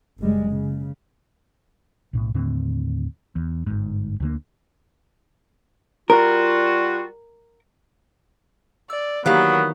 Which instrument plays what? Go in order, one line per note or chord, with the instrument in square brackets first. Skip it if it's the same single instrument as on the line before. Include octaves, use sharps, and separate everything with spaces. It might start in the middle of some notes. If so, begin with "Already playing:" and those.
[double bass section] F#1 G3 G#3
C#3
[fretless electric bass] B1 A2
D#2 A2 D3 C4
E2
G1 G#2
D2 D3 A#3
[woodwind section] G3 F4 F#4 [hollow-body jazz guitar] A#4
[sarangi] D5 [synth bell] E6
[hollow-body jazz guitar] D#3 E3 A#3 [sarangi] F#3 [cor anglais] B3 [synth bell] G4 F5 F#6